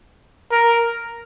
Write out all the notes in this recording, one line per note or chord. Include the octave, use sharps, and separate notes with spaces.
A#4